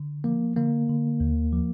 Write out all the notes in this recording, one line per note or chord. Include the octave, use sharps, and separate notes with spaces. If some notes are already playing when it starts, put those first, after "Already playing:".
Already playing: D3
F3 A#3
D3 A#3
D3
D#2
F3